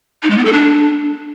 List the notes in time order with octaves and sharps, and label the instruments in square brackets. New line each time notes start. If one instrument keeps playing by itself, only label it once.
[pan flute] D#4
G#3
B3
A4
D4